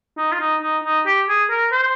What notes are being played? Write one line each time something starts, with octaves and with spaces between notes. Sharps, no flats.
D#4
F4
D#4
D#4
D#4
G4
G#4
A#4
C5